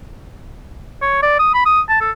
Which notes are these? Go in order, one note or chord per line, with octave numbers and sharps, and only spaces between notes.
C#5
D5
D#6
B5
D#6
A5
A4